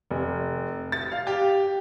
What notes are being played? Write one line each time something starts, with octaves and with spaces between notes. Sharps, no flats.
F1
A6
F5
G4